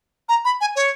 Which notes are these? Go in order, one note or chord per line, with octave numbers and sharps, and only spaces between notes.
A#5
B5
G#5
C#5